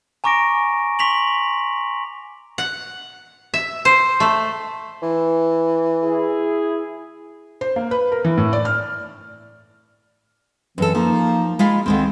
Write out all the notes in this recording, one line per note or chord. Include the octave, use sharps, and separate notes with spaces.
G#5 A#5 C#6 D6 A#6 D7
C6 C#6 B6 F7 F#7
F#5
E5
C5
A3
E3
E4 G#4
C5
A#3
B4
A#4
E3
A2
D5
F6
F#2 E3 C4 A4
F3 A#3 D#4
G#3 F4 F5 B5
C#2 D3 D#3 G#3 C4